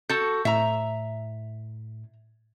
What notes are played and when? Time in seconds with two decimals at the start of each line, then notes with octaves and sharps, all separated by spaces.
0.10 F#4 A4 G6
0.45 A2 E5 A#5